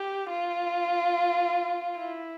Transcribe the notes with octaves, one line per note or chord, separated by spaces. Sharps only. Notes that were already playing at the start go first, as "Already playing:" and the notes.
Already playing: G4
F4
E4